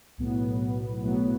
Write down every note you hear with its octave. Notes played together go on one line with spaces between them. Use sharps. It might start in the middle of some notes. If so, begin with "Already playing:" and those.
B1 A2 F#3 B3
B1 A2 F#3 B3